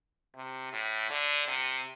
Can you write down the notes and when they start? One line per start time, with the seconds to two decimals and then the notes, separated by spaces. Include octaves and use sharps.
0.36 C3
0.73 A2
1.10 D3
1.48 C3